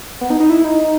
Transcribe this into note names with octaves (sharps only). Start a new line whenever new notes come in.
B3
D#4
D#4
E4
D#4